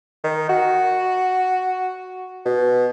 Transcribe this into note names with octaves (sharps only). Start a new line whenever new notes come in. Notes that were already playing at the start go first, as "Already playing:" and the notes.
D#3
F#4
B2